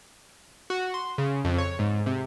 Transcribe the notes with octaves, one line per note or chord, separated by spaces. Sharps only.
F#4
C6
C#3
F2
C#5
G#2
C3